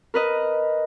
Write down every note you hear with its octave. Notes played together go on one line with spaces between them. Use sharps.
A#4 B4 D#5